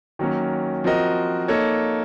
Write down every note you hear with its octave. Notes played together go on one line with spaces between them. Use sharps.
D#3 F#3 A#3 C#4
F3 C4 F#4 A#4 D#5
A#3 D#4 A4 C#5